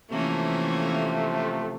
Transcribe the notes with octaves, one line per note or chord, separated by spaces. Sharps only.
C3 E3 F3 A3 A#3 C#4